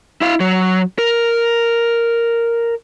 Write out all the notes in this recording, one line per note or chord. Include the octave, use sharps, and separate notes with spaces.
E4 F5
F#3
A#4